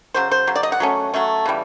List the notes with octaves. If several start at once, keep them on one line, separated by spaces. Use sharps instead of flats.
C#3 F#3 C5
C5
C#3 F#3
D5
D#5
F#5
F#3 A3 C#4
F#3 A3 C#4
C#3 E3 G3